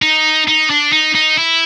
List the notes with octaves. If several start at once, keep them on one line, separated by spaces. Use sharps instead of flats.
D#4
D#4
D4
D#4
D#4
E4